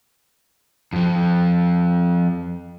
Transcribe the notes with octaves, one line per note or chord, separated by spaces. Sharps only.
F2 F3